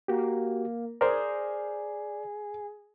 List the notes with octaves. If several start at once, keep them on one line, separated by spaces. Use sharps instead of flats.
A#3 F#4 G4
G#4 A#4 C5 D5